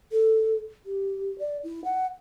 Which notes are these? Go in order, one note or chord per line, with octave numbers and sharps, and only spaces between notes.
A4
G4
D5
E4
F#5